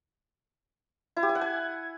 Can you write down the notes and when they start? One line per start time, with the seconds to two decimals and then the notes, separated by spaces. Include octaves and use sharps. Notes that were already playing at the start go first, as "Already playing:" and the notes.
1.17 E4
1.23 G4
1.29 G#5
1.35 F#5
1.41 G#5